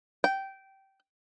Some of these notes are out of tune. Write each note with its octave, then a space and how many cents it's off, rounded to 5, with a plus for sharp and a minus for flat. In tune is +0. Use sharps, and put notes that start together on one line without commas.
G5 -15